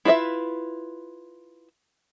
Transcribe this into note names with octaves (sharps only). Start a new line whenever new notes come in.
E4 F4 B4 D#5 E5